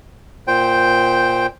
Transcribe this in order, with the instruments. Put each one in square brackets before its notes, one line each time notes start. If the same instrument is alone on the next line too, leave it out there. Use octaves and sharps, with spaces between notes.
[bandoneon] A#2 C5 G5